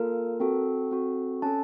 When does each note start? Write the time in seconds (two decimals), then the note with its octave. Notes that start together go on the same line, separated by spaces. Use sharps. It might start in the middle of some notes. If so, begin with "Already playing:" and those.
Already playing: A#3 F4 A4 A#4
0.40 C4 F#4 A4
0.91 C4 F#4 A4
1.42 C#4 A4 A5